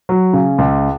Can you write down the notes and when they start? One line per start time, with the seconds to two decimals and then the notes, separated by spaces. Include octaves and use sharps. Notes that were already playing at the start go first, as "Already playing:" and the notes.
0.09 F#3
0.33 C#3
0.58 C#2